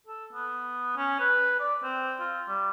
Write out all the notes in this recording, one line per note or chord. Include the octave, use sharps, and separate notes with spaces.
A4
B3
C#4
B4
D5
C4
F4
G3